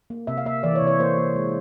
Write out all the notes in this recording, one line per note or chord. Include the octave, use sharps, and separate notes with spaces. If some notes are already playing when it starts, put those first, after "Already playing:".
A#3
C3 E5
F5
A#3 E5
E3 D5
C#5
C3
C#5
A#3 C5
A#3
G#3